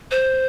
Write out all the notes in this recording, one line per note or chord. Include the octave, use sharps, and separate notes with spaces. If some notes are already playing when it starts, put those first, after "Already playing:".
C5